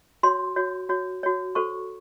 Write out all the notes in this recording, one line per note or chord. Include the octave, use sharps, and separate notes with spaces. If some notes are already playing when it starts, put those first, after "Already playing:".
F#4 C#5 C6
F#4 C#5
F#4 C#5
F#4 C#5
F#4 A4 C5 C#6